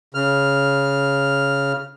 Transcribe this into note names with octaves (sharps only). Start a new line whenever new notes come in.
C#3 F6